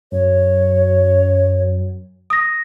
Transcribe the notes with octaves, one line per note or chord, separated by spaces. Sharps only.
F#2 C#5
D#6 A#6